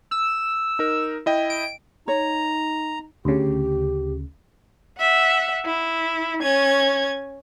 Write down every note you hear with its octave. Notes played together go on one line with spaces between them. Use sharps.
E6
D#4 A#4
E4 D#5 G5
D7
D#4 C#5 A#5
D2 C#3 G4
E5 F#5
E4
C#4 G#6